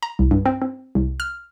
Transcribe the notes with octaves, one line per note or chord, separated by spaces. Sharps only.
A#5
C2
G2
C4
C4
C2
F6